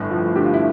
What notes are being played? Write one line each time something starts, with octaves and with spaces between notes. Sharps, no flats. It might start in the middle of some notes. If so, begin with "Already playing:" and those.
Already playing: G1 A2
F3
D3 G4
F4
E4